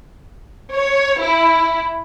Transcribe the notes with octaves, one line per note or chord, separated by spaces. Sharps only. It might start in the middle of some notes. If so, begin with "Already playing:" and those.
C#5
E4